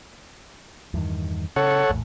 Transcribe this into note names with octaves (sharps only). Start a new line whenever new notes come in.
E2 G2 D#3
C#3 A4 C#5 F#5
A#1 E2 A2